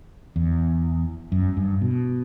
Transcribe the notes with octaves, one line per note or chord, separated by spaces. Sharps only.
E2
F#2
G2
B2